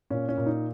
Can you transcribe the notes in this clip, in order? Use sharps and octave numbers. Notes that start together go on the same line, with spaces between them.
A#2 C#4
C#4
A#2
D#4